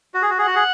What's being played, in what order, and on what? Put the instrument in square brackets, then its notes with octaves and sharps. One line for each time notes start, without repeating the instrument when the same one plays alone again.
[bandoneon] F#4
G#4
F#4
[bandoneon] G#4 [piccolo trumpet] F#5
[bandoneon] F#4
G#4